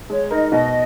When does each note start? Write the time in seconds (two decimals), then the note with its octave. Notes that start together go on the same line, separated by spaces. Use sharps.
0.10 G#3 C#5
0.31 D#4 A#4 D#5
0.52 B2 D#5